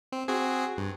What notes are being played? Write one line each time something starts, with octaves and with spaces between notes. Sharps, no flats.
C4
C4 F#4 G#4
G2